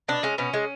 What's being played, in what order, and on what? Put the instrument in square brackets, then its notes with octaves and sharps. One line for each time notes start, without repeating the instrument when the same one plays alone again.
[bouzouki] B2 D4
G#3 C#4
B2 C#4
G#3